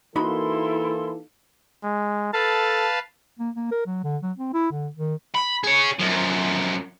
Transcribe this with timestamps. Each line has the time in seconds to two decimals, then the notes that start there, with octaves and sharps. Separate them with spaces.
0.16 E3 A#3 D#4 E4 F#4 A4 B5 C6
1.83 G#3
2.33 A4 B4 F5 A5
3.39 A#3
3.56 A#3
3.71 A#4
3.86 F#3
4.04 D3
4.23 F#3
4.38 C4
4.53 E4
4.71 D3
4.97 D#3
5.35 B5
5.64 G#4 C#5
5.99 F#2 F3